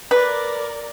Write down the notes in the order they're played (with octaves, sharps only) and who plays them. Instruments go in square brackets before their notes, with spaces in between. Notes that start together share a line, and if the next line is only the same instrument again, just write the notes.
[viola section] A#4 D5 [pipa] B4